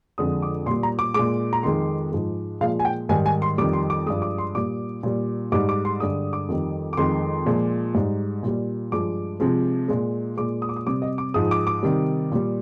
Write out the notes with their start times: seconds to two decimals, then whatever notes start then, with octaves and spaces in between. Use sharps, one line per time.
0.18 F2 D3 F3 G#3 D#6
0.42 D6
0.66 A#2 C6
0.70 G3
0.83 A#5
0.99 D6
1.14 A#2 G#3 D6
1.53 A#5
1.63 F2 D#3 G#3 C6
2.12 G#2 F3 G#3
2.61 A#2 F3 G#3 F5
2.79 G#5
2.85 G5
3.09 G#2 D#3 G3 G#5
3.26 G#5
3.42 C6
3.58 F2 D#3 G3 D6
3.73 C6
3.90 D6
4.06 G2 F3 G#3 D#6
4.22 D6
4.38 C6
4.55 A#2 G3 D6
5.03 A#2 G3
5.52 G#2 G3 D6
5.69 D6
5.85 C6
6.00 G2 D3 G#3 D#6
6.33 D6
6.49 F2 D#3 G3
6.93 D6
6.97 F2 D#3 G#3 C6
7.46 A#2 F3 G#3
7.94 G#2 G3
8.43 A#2 G3
8.92 G2 F3 G#3 D6
9.40 C3 F3 G#3
9.88 A#2 G#3
10.37 A#2 G#3 D6
10.62 D#6
10.69 D6
10.76 D#6
10.87 C3 G3 D6
11.02 D#5
11.18 D6
11.34 G#2 F3 G#3 D#6
11.51 D6
11.67 D6
11.83 C3 D#3 G3
12.32 A#2 G3